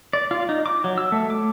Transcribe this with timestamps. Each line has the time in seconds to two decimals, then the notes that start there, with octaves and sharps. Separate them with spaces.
0.13 D5
0.31 F4
0.49 D#4
0.66 D6
0.84 F#3
0.98 E6
1.12 A3
1.30 D6